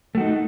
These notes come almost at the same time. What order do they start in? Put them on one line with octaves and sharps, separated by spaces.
A3 F#4 D#4